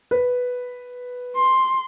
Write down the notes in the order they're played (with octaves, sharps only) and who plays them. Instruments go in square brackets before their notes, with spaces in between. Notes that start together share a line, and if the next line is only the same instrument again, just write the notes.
[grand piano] B4
[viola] C6